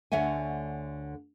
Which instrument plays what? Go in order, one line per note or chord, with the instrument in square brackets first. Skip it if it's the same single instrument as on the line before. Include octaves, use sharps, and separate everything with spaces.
[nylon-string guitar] D2 D3 C#5 E5 F#5 G#5